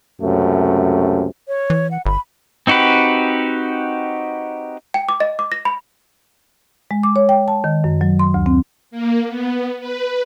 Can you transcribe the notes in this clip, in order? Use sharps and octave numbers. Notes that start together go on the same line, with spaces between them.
C#2 F#2 C3 A3
C#5
E3
F#5
G1 B5
C4 D#4 F#4 G4 B4
G5
D6
D#5
D6
A#6
B5
G#3
D6
C#5
G5
A5
D#3
F#2
F#3
C6
D2
C4
A#3
B3
B4